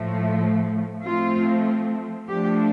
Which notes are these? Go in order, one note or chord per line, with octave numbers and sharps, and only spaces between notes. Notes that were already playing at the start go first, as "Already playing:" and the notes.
Already playing: A2 F3 A3
F3 A3 C4 F4
F3 A3 D4 G4